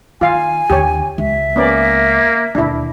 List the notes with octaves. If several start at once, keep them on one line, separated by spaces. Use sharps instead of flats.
D#3 F4 F5 G#5
D#2 D3 G4 C#5
C#2 G#3 E5
A#3 B3 C#4 D5
E1 D#2 D4 E4